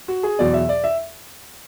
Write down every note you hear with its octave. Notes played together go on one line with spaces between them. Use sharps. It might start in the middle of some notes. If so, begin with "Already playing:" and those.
F#4
G#4
E2 B2 F#3 D5
E5
D5
E5